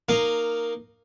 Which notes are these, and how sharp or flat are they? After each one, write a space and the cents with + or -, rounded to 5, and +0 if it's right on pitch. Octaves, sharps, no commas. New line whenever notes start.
A#3 +0 D#4 -15 F5 +0